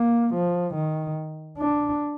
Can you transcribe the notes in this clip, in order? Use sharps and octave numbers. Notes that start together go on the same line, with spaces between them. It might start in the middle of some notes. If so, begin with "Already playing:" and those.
Already playing: A#3
F3
D#3
D4